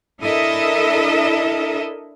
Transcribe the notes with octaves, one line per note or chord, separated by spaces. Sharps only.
D4 E4 A4 A#4 D#5 E5